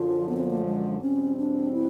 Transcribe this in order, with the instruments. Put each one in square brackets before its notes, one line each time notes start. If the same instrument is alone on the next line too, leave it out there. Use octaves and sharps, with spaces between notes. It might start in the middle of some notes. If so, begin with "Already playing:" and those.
Already playing: [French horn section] F#2 D3 F3 [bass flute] F4
[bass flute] B3
C4
B3
A#3
A3
G#3
[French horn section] E2 B2 G3 C4 [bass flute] C#4
[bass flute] D4
E4